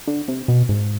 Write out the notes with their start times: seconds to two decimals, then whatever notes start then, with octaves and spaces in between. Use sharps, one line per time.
0.07 D3
0.28 C3
0.48 B2
0.69 G#2